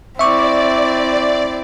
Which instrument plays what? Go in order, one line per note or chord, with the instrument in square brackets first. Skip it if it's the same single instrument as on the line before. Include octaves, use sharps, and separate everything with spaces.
[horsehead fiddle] C4 E4 [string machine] D5 [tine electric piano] E5 C#6 D6